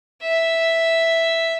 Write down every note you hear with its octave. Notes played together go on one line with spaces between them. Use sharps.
E5